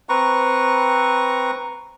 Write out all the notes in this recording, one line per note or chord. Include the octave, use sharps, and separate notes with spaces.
C4 B4 A#5 C#6